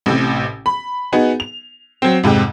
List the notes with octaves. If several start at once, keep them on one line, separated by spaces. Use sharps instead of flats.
A1 A2 C3
B5
B3 D#4 F#4 G#4
F7
F#3 C4
F2 G#2 C3 G5